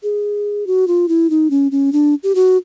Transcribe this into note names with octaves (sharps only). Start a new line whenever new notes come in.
G#4
F#4
F4
E4
D#4
C#4
C#4
D4
G4
F#4